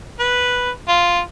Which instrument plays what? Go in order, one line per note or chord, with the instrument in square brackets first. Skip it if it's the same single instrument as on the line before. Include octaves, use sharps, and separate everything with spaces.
[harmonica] B4
F4